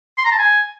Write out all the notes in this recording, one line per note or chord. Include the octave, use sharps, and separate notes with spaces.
C6
A#5
A5
G#5